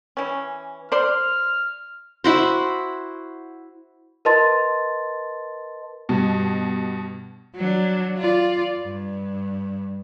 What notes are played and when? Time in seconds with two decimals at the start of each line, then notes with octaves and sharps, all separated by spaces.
0.17 E3 C#4
0.92 C5 D5 C6 F6
2.24 E4 F#4 C5
4.25 A#4 B4 D#5 A5 C6 A6
6.09 G2 B2
7.56 F#3 D4
8.18 F4 D5
8.83 G2